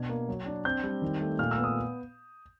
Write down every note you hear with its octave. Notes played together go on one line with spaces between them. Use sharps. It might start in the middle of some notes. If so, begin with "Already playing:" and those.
Already playing: B2 D4 G#6
A#3
F#3
D4
C4 G6
G3
D#3
A3
A#2 F6
E6
B3
D#6